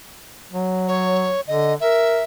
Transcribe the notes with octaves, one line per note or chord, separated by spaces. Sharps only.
F#3
C#5
D3 D#5
A#4 E5